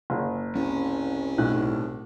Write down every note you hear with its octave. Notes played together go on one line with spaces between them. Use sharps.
F#1
C2 C#4
B1 A2 F#6